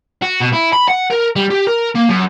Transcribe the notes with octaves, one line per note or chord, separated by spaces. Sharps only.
F#4
B2
E4
B5
F#5
A#4
G3
G4
A#4
A#3
F#2